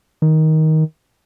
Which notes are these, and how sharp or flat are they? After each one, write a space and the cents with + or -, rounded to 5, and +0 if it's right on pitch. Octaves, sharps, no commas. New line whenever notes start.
D#3 +15